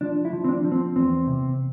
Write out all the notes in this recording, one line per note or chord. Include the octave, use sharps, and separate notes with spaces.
F3 D4
E4
F3
C4
D4
F3
C4
E2 C4
C3